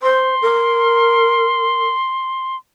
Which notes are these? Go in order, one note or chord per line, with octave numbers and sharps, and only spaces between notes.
C5 C6
A#4